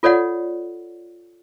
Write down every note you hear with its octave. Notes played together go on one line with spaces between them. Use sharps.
F4 A4 C#5 D5 F#5